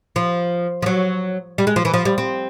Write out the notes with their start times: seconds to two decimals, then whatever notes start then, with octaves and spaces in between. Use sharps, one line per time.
0.16 F3
0.82 F3
0.86 F#3
1.58 G3
1.67 G#3
1.76 F3
1.85 E3
1.94 F3
2.05 G3
2.18 C4